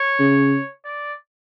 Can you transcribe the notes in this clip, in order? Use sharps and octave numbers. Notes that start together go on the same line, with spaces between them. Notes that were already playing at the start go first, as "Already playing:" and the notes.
Already playing: C#5
C#3
D5